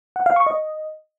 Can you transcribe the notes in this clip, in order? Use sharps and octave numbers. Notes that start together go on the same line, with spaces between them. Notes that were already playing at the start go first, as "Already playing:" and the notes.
F#5
F5
C#6
D#5